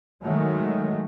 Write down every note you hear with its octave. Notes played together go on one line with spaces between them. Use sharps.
D#3 F#3 G#3 A3